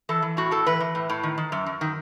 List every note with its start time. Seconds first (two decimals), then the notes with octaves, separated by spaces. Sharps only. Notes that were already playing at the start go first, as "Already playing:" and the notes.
0.09 E3 A4
0.22 E3
0.37 A2 F#4
0.51 A2 A4
0.66 E3 B4
0.80 E3
0.95 A2
1.09 A2
1.23 D#3
1.38 D#3
1.52 F#2
1.66 F#2
1.81 D#3